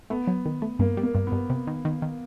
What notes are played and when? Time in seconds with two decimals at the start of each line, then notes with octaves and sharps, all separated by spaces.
0.10 A3 B3
0.27 F#3
0.46 D#3
0.62 A3
0.79 G2 A#3
0.97 G3
1.03 A#3
1.15 G2
1.27 B3
1.32 G2
1.50 C3
1.67 D#3
1.85 D#3
2.02 D#3